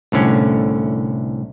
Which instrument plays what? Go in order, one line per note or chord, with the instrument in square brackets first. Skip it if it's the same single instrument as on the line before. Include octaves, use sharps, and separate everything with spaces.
[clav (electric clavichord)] C2 A2 D3 C#4